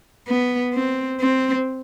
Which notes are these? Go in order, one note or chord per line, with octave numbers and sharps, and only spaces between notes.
B3
C4
C4